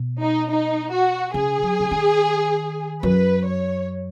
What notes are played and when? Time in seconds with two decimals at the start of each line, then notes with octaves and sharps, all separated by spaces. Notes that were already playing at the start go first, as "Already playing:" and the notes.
Already playing: B2
0.22 D#4
0.50 D#4
0.93 F#4
1.34 C#3 G#4
1.62 F#3
1.80 C#3
1.91 D#3
3.03 F#2 B4
3.46 C#5